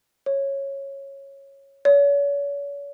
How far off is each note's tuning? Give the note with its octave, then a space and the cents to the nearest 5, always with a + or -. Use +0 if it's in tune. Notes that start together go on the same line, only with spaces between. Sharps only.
C#5 -10
C#5 +40